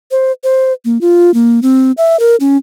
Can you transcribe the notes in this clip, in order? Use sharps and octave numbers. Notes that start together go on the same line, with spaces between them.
C5
C5
A#3
F4
A#3
C4
E5
A#4
C#4